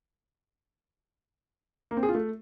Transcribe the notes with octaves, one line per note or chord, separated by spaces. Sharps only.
A#3
C4
G#4
F4
A3